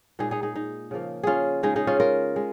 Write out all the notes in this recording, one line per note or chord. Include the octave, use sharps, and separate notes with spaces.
A#2 G#3 D#4 G#4
D#4 G#4
D#4 G#4
D#4
C#3 F3 A#3
C#4 F4 G#4
C#3 G#3 D#4 G#4
D#4 G#4
C#4 F4
F4 A#4
G#3